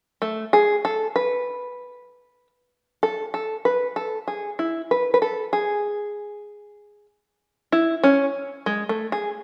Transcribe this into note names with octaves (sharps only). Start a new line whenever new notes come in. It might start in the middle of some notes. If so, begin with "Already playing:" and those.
A3
G#4
A4
B4
A4
A4
B4
A4
G#4
E4
B4
B4
A4
G#4
E4
C#4
G#3
A3
G#4